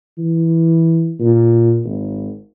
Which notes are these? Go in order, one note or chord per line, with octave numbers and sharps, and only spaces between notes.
E3
A#2
G#1